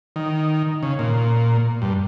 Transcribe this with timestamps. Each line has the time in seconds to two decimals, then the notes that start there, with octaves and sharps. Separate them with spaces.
0.16 D#3
0.83 C#3
0.99 A#2
1.82 G2